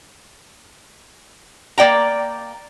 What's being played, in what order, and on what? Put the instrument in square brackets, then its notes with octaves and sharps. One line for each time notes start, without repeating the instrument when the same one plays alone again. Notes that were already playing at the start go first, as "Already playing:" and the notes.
[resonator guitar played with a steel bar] A#3 D5 G5 A#5